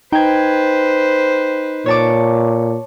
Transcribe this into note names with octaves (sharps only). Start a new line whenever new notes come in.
D#4 B4 C5 G5 G#6
A#2 C#5 A5 D6